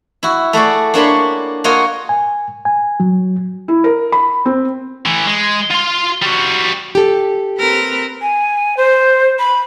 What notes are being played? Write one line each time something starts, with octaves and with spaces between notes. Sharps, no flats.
E4 F#4
A3 F#4 G#4 D5
A#3 D4 C#5 B5 C6
A#3 F4 F#4 C#5 D#5
G#5
G#5
F#3
E4
A#4
B5
C4
E3 A3
G#3
F4 C6
G3 F#4
G4 A4
C4 A#4 B4
G#5
C5
B5